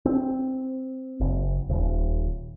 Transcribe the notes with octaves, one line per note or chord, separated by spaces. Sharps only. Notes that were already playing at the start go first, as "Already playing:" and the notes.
C4
F#1
D#1